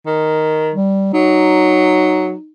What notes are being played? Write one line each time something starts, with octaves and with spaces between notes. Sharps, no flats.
D#3
G3
F#3 D#4